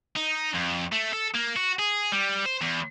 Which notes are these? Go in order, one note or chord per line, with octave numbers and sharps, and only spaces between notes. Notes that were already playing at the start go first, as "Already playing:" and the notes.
D#4
F2
A3
A4
A#3
F#4
G#4
G3
C5
E2